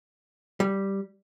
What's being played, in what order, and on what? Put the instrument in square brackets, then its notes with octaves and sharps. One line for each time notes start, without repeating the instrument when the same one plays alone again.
[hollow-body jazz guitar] G3